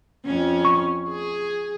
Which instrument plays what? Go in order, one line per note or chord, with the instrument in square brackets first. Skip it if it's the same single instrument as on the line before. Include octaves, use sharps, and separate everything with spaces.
[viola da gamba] F2 C#4
[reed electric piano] C#6
[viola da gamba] G#4